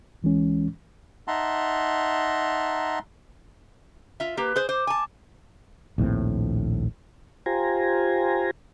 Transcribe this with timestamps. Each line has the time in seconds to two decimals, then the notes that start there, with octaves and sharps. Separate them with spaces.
0.23 D2 E3 G#3 C#4
1.28 D#4 E5 F#5 A5 A#5 C6
4.20 F4 E5
4.37 A#3 G4 B4
4.56 G#4 C5
4.69 C5 D6
4.87 G#5 A5
5.98 A#1 D#2 A2 C4
7.46 F4 G4 C5 G#5 A#5